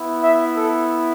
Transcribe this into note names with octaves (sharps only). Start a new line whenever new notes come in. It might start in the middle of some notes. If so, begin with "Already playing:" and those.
Already playing: B3 E4
E5
A4